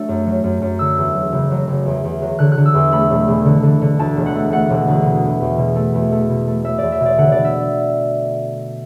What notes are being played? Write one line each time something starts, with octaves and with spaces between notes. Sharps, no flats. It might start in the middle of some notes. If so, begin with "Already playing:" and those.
Already playing: F#3 A3 D4
F#2
F#3
F#2
F#2
D3 E6
E2
F#3
F#1
F#3
F#1
E2
E2
F#3
D3 F#6
F#6
D3
E6
E2
A3 B5
E1
E1
D3
D3
D3
D2 A5
E1
F#5
A3
A3 F#5
E1
D2
B2
E2
E2
B2
A3
E2
A3
B2
A3
A3 E5
E2 D5
E5
B2
D5
D3 F#5
D3 D5
E5